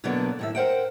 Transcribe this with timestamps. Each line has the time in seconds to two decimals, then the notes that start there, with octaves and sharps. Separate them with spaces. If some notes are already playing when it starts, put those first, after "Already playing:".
0.04 B2 D3 F#3 A#3 B3 D4
0.39 A2 D#3 E5
0.55 A#4 C5 F#5 G5